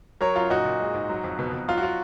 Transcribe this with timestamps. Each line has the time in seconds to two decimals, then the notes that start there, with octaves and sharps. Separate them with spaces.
0.21 F#3 A#4 C#5
0.35 F#2 F4
0.50 A#2 D#4 F#4
0.65 A#2
0.80 G#3
0.94 G#2
1.09 F#3
1.24 F2
1.39 B2
1.53 B2
1.68 F#3 F4
1.78 F#4
1.83 F4